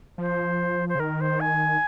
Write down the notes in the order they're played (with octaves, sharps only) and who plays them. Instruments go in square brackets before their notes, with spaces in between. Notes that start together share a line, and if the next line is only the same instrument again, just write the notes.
[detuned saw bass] F3 [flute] C5
[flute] C5
[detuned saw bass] C#3
[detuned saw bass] D#3 [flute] A#4
[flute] C5
G#5